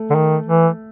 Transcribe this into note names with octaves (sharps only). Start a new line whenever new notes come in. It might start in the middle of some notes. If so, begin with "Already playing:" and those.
Already playing: A3
D3
D#3
E3